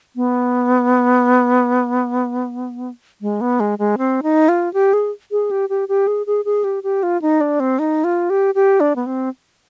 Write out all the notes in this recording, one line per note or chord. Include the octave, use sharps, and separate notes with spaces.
B3
G#3
B3
G#3
G#3
C4
D#4
F4
G4
G#4
G#4
G4
G4
G4
G#4
G#4
G#4
G4
G4
F4
D#4
D4
C4
D#4
F4
G4
G4
D4
B3
C4